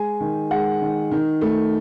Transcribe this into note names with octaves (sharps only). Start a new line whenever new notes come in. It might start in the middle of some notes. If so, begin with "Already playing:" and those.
Already playing: G#3 G#5
D#3
G#3 F#5
D#3
D#3
A3